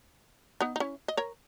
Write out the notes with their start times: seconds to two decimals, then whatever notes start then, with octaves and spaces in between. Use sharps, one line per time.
0.61 B3 D#4
0.76 D#4
0.80 C#4 E4
1.08 D#5
1.17 A#4 C#5